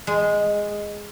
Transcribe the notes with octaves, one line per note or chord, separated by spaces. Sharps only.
G#3